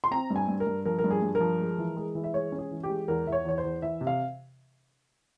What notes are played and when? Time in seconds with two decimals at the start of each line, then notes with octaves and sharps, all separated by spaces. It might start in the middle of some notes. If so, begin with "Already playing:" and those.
0.04 C6
0.11 C4 A#5
0.30 G2
0.36 G#5
0.48 G2
0.60 A#4
0.67 G2
0.85 F3 A#4
0.99 A#4
1.04 G2
1.11 G#4
1.22 G2
1.35 A#4
1.40 F3
1.60 G#3
1.78 E3
1.96 G#3
2.15 E3
2.24 E5
2.34 G#3 C#5
2.52 C#4
2.59 G#4
2.71 E3
2.83 G4
2.89 G#3
3.08 E2 A#4
3.27 E2 E5
3.32 C#5
3.45 E2 C#5
3.58 C5
3.64 E2
3.82 E3 E5
4.01 C3
4.07 F5